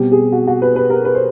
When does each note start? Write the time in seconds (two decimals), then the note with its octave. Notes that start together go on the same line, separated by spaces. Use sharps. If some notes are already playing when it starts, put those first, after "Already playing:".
Already playing: B2 G3 C4 G4
0.12 G#4
0.32 F#4
0.48 F#4
0.62 B4
0.76 B4
0.90 A#4
1.05 B4
1.15 C5